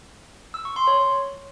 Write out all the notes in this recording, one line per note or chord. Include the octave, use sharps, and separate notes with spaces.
E6
C#6
C6
C#5